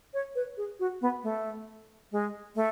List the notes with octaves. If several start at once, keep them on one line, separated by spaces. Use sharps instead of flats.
C#5
B4
G#4
F#4
B3
A3
G#3
A3